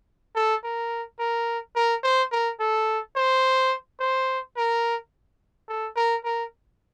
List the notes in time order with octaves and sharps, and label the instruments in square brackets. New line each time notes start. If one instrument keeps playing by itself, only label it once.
[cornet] A4
A#4
A#4
A#4
C5
A#4
A4
C5
C5
A#4
A4
A#4
A#4